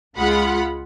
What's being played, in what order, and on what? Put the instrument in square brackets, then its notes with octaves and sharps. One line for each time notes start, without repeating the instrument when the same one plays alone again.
[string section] C#2 G#3 F4 F#5 B5